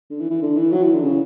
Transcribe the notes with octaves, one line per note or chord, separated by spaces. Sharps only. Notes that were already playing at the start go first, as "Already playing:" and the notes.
D3
E3
E3
D3
E3
F#3
E3
D3
C#3